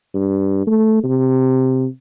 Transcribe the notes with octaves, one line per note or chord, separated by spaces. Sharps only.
G2
A3
C3